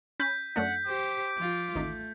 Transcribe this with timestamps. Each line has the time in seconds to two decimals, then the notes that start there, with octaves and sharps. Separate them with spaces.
0.20 C#4 B5 G6 B6
0.56 F#2 A3 D4 F#5
0.87 G4 C5 D6
1.38 F3 F4
1.75 A1 D#2 A3 D#4